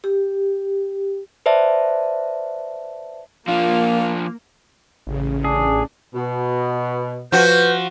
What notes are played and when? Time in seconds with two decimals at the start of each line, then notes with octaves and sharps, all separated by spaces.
0.04 G4
1.46 B4 C5 D5 E5 A5
3.48 F3 A#3 D4 F4
5.07 A1 C#3
5.45 D4 G#4
6.15 B2
7.32 F3 F#4 B4 G6